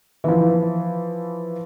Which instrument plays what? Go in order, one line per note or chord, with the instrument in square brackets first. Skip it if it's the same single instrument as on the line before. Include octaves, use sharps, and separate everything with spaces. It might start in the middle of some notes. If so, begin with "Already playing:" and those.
[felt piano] E3 F3